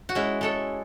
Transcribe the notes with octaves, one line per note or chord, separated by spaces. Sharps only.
F#4
G#3 C#4 E4
G#3 A4 C#5